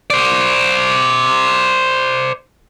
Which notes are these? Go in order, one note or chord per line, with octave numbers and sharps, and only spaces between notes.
C5 D5